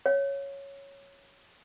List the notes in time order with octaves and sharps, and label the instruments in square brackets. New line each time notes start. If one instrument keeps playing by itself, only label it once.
[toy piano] C#5 F5